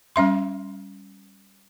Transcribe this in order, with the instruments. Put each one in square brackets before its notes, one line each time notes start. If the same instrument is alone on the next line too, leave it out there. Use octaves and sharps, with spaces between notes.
[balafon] G3 C#4 E5 C6